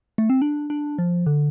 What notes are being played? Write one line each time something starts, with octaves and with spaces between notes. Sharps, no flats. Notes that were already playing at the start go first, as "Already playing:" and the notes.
A3
C4
D4
D4
F3
D3